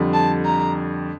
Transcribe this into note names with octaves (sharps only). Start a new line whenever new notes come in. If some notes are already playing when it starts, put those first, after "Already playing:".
Already playing: F2 D3 G3
A5
A#5